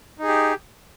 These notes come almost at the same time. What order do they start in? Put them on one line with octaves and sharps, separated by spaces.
D#4 G#4 G4